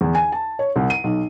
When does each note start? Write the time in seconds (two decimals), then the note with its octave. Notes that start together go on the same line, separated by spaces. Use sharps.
0.01 E2
0.15 G#5
0.32 A5
0.59 C#5
0.76 C2
0.90 D#7
1.04 B1